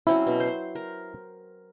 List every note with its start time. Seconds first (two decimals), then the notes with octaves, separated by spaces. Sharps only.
0.07 F#3 C4 C#4 E4
0.27 B2
0.40 C5
0.75 A#4